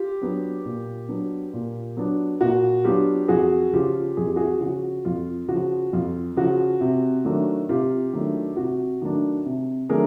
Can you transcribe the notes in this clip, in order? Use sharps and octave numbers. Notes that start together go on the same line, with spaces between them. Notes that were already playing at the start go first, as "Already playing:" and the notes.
Already playing: F4 G4
F#3 B3 D4
A#2
F#3 B3 D4
A#2
F#3 B3 D4
A#2 F#4
F#3 B3 D4 F4 G4
F2 F#4 G#4
C#3 F3 F4 G4
F2 G#4
G4
F#4 G#4
C#3 F3 F#4
F2 F4
C#3 F#4
F3
F2 F4
C#3 F3 F#4
C3
D#3 F#3 A3 D4
C3 F4 G4
D#3 F#3 A3 D4
C3 F#4
D#3 F#3 A3 D4
C3
D#3 F#3 A3 D4 G#4 A#4